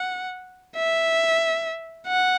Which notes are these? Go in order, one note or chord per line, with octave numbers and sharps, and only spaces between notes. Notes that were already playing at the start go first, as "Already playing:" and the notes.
Already playing: F#5
E5
F#5